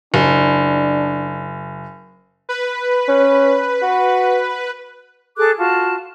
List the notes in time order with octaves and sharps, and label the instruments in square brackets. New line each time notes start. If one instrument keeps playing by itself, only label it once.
[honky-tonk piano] F#1 [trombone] D4
[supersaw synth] B4
[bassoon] C#4
F#4
[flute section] G#4 A4 D6 F#6
F4 F#4 A5